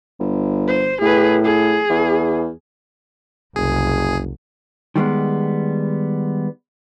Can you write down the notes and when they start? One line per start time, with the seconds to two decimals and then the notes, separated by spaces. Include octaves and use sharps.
0.20 G1
0.68 C5
1.01 A2 G#4 B4
1.44 G#4
1.90 E2
3.56 F#1 C2 G#4
4.96 D#3 G3 G#3 B3